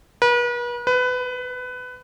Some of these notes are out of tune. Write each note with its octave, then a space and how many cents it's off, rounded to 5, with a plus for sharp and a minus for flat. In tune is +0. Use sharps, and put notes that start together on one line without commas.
B4 -40
B4 +20